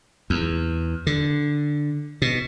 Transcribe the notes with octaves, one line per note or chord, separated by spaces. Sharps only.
E2
D3
B2